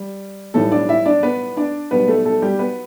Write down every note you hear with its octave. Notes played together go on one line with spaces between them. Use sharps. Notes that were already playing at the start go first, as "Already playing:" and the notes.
Already playing: G3
B1 A2 E3 G3 A3 A4
D4 D5
E4 E5
D4 D5
B3 B4
D4 D5
B1 B2 G3 B3 B4
A3 A4
A3 A4
G3 G4
B3 B4